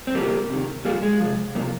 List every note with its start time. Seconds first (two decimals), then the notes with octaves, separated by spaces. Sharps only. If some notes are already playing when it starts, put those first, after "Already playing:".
0.07 C4
0.15 C3 F3 G3 A#3
0.50 C3 D#3
0.85 A#2 G3 A#3
0.89 F3
1.02 G#3
1.20 C3 F3
1.55 C3 G3 A#3
1.60 F3